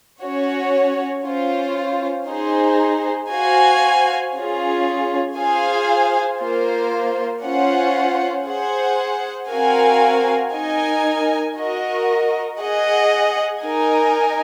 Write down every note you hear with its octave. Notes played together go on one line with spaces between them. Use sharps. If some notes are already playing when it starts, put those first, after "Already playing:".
C#4 F#4 C#5
C#4 F4 C5
D#4 G#4 C5
F#4 C5 F5 G#5
C#4 F4 G#4
F4 G#4 C5 F5 G#5
A#3 F4 C5
C#4 F4 C5 F#5
G#4 C5 F#5
C4 F#4 A#4 F5 G#5
D#4 A#4 D#5 G#5
F#4 A#4 D#5
G#4 D#5 F#5
D#4 A#4 D#5 G#5